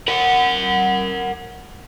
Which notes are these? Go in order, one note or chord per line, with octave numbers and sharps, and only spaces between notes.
A#4 F#5